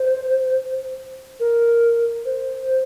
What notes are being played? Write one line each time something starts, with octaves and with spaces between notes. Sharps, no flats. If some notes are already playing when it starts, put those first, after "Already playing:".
Already playing: C5
A#4
C5